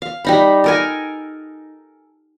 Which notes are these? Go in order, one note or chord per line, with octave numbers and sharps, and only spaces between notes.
F5
G3 D#4 B5
A4 A#4 G#5